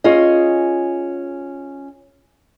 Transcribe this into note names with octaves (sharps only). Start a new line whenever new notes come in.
C#4 F4 G#4 D#5